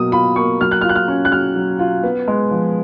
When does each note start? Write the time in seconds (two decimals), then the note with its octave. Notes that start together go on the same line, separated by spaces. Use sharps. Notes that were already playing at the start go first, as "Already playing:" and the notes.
Already playing: B2 F#3 A#3 D#6
0.12 F4 B5
0.36 A#3 C#6
0.61 F#3 F6
0.71 F#6
0.81 F6
0.84 F4
0.89 F#6
0.96 F6
1.08 C#4
1.25 F#6
1.31 F#3 F6
1.56 F#3
1.79 F4
2.03 B3
2.28 G#3
2.51 F3